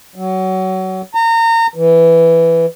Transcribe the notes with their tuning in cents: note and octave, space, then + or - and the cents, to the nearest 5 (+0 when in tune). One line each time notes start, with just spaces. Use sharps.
F#3 +25
A#5 -30
E3 +5